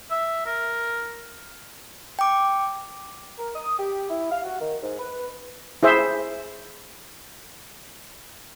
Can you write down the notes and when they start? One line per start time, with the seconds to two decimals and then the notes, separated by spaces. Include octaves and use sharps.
0.11 E5
0.46 A#4
2.19 G5 D6
3.39 A#4
3.55 D#6
3.78 G4
4.10 E4
4.30 F5
4.44 F#4
4.61 D#3
4.82 G#2
4.99 B4
5.83 E4 G#4 C5 E5